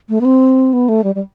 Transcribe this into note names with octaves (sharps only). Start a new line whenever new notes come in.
A3
B3
C4
B3
A3
G3
G3